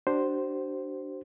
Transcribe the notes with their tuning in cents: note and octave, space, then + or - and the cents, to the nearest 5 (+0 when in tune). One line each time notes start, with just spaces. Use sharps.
D4 +0 F#4 +45 C5 +0